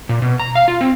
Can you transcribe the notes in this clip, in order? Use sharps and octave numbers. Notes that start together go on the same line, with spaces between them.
A#2
B2
A#5
F5
F4
C4